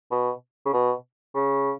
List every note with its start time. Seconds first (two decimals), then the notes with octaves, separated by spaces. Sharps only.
0.12 B2
0.66 C#3
0.73 B2
1.35 C#3